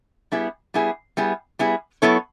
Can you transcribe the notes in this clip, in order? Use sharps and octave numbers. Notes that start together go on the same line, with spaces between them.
G3 B3 E4 G#4
G3 B3 E4 G#4
G3 B3 E4 G#4
G3 B3 E4 G#4
F#3 B3 E4 A4 C#5